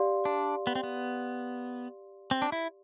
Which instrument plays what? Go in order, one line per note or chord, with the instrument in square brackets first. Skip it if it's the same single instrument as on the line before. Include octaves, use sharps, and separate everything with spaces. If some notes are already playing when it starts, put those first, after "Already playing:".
Already playing: [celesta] G4 D5 F5 C6
[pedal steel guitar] D4
B3
C4
B3
C4
D4
E4